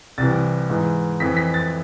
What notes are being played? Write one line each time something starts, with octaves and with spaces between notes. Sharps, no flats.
C2 C3 E3 A6
G#2 E3
F2 E3 B6
B6
A6